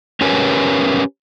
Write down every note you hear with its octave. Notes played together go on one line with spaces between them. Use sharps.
C#4 G4 A#4 B4 C#5 G#5